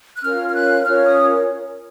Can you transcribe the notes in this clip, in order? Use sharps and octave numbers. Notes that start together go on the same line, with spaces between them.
F#6
C#4 F4 A#4 C#5 F6
F6
F#6
C#4 F4 A#4 C#5 F6
D#6